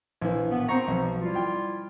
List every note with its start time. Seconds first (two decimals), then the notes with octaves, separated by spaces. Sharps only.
0.21 A#1 E3
0.51 A2 D#3 B3
0.68 B3 C4 C5 A#5 C#6
0.88 B1 F3
1.22 G3 E4 F4
1.35 G5